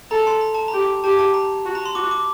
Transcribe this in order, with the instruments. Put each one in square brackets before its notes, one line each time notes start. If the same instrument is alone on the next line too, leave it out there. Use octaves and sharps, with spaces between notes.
[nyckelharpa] A4 [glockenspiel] A#5
[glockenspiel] C6
A#5
A5
A#5
[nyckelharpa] G4
[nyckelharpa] G4 [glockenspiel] A5
[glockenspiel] A5
A#5
[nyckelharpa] F#4
[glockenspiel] A#5
C6
[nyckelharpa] F#4 [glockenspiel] D6
[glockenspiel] D6